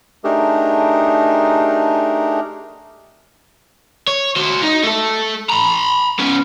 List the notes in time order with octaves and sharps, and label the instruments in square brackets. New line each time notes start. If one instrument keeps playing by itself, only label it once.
[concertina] A3 D4 D#4 G4 G#4 A#4
[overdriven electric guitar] C#5
F#4 C5
D#4
A3 A4
A#5 B5
B3 C#4